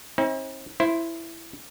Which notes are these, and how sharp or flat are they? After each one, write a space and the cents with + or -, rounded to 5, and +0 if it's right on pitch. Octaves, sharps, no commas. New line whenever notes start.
C4 +40 D#4 +45
E4 +10 C5 +0